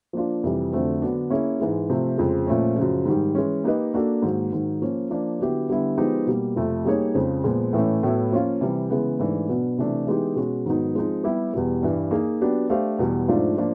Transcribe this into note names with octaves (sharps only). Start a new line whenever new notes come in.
F3 A#3 D4 F4
F2 C3 E3 G3
F2 D3 F#3 A3 C4
D3 F#3 B3 D4
A#3 C#4 E4 G#4
G#2 E3 G#3
C3 F3 A3
F2 C#3 F3 G#3
A#2 F3 A3 C#4
F#2 C#3 F3
G#2 D#3 G3
E3 G#3 C#4
A#3 D#4 G4 B4 D#5
A#3 D4 F#4 A4
G#2 D#3 F#3 A#3
G#2 D#3 F#3
F3 A#3 C#4
F3 A#3 D4
D3 F#3 B3 E4 G4
D3 G3 B3 E4
F3 G#3 B3 D#4 G4
B2 G3 A#3
F2 C3 F3 A3 C4
G3 A#3 D#4 G#4 C#5
F2 C#3 F3 G#3
A#2 F3 G#3 B3
A2 E3 A3 C#4
A2 F#3 B3 E4 A4
F3 A#3 C#4 F4
C3 E3 G3
C#3 E3 G#3 B3
G#2 E3 A3 D4
B2 F#3 B3 D4
C3 E3 A3 D4
E3 G#3 B3 D#4 G4
B2 G#3 C#4 F#4
G#2 D#3 F#3 B3 D#4
F3 G#3 C4 D#4
G3 B3 E4 G4
E2 B2 G3
G2 E3 G3
A#3 D#4 G#4
F#3 B3 D4 G4
A3 D4 G4 C5 F5
E2 B2 G3
G#2 F3 A3 D4 F4
F3 A#3 D4